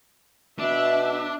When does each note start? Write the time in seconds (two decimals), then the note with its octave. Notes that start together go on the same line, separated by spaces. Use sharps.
0.59 B2 D4 E5